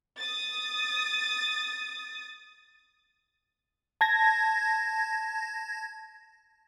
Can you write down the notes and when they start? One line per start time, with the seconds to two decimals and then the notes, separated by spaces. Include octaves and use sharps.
0.16 D#6 A6
4.01 A5 G#6 A#6